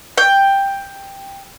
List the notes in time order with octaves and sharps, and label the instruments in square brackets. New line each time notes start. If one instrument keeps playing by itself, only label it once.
[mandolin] G5